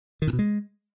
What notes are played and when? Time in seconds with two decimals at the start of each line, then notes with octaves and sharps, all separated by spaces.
0.22 D#3
0.27 A2
0.33 B2
0.39 G#3